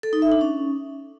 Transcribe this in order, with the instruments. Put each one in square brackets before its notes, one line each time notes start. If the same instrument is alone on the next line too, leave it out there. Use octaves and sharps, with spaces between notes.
[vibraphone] A4
D#4
E5
D4
C#4